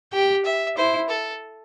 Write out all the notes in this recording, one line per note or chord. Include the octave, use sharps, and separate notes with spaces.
G4 G5
E5
E4 C5
A4